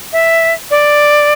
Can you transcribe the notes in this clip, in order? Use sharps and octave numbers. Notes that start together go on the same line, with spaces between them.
E5
D5